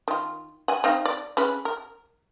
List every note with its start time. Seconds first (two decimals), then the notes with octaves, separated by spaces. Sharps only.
0.08 D#3 F4
0.68 F#5 G#5
0.84 C4 D#4 F5
1.05 D5
1.37 C#4 G#4 B4
1.65 A#4